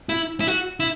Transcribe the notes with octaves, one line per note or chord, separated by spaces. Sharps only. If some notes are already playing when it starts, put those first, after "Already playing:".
E4
E4
F#4
E4